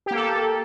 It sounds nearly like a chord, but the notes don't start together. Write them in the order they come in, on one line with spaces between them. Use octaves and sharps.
G4 A#3 A4